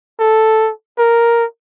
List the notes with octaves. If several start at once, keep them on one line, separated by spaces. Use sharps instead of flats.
A4
A#4